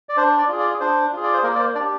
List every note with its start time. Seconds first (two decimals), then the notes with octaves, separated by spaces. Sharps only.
0.09 D5
0.17 D4 C5
0.38 D5
0.48 F4 G#4
0.60 D5
0.80 D4 C5
1.13 F4 G#4
1.23 D5
1.33 C5
1.43 A#3 A#4
1.55 D5
1.60 C5
1.75 D4 G4 D5